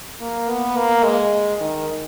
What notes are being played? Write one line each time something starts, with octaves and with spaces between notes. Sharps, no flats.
A#3
B3
A#3
G#3
D#3